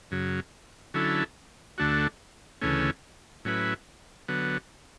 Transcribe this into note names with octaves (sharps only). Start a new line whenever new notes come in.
F#2 C#3 F#3
D3 F#3 C#4 E4 A4
D2 D3 A3 D4 F#4
D2 C#3 E3 A3 C#4
A2 F#3 C#4 E4 B4
D3 F#3 B3